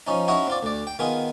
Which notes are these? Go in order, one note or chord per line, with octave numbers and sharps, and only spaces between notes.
F3 C#4 D#4
C#4 D#4 E4 F#4 D#5 F#5
C4 F4 D5
D2 D5
G5
D#3 B3 F4 G#4